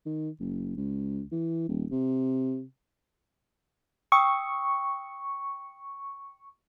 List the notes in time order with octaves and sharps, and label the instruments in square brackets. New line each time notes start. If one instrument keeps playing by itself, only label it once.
[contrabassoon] D#3
F#1
C#2
E3
D#1
C3
[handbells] G5 D#6 E6 [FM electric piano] C#6